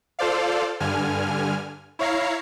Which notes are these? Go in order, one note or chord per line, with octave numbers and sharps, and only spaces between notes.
F4 A4 C5 D5 F5
G2 D3 G#5 F6
E4 C#5 F5 A#5 C7